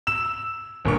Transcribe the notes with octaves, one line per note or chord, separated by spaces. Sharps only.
E6 E7
G1 A#2 C#6